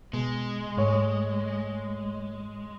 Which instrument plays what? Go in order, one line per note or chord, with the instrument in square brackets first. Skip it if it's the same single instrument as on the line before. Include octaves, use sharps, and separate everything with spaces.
[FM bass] B2 [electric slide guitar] G#3
[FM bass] G#2 [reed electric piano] A3 C#5